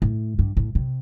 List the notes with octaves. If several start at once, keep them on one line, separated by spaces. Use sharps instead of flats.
A2
G2
A2
C3